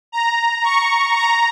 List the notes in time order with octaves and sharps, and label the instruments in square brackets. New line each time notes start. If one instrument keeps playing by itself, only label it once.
[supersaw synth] A#5
C#6
A#5